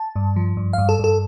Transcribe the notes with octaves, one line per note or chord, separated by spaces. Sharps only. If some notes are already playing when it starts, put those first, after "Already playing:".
Already playing: A5
G2
F3
G2
G2 F5
A4
G2 A4